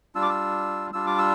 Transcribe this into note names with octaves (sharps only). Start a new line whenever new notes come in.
G3 D4 F4 E6
D6
E6
G3 D4 F4 E6
D6
E6